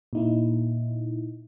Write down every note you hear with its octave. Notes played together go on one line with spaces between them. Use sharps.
A#2 D#4 E4